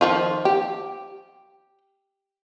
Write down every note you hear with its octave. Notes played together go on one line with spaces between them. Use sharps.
D#3 F3 F4
G4